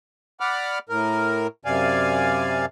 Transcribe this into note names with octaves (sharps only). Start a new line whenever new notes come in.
D5 F#5 B5 D6 F6
A2 A#4
F#2 C3 D5 F5 G#5